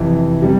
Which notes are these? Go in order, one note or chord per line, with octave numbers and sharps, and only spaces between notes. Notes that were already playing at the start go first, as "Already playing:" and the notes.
Already playing: F2 C3 E3
C3 G3